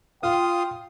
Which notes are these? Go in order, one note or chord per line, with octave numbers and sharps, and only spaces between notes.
F4 F5 G5 D#6